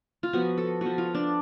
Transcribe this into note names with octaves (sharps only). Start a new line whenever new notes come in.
F4
F3 B3 F#4
A4
F3 B3 F#4
F4
D4